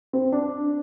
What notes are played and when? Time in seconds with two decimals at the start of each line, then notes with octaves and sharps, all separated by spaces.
0.13 C4
0.32 D4